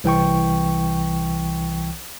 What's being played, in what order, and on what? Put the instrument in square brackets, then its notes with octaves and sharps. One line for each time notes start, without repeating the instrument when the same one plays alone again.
[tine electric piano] C2 E3 G5 C#6